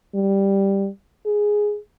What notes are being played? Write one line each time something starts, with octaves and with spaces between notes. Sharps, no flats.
G3
G#4